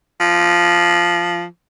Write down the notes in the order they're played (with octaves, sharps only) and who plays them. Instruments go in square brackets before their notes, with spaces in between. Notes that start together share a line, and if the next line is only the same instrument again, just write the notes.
[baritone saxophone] F3